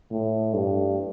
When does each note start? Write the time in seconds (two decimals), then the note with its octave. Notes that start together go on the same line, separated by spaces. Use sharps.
0.11 A2
0.54 G2